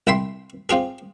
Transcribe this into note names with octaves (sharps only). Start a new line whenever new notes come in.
C2 E4 G5 B5 C6
C4 F4 G4 G#4